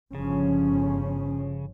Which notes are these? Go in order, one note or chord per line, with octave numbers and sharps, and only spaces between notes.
G1 C#3 F3 C#4